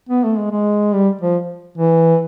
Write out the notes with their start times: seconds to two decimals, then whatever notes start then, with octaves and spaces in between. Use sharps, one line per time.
0.09 B3
0.24 A3
0.38 G#3
0.51 G#3
0.94 G3
1.22 F3
1.78 E3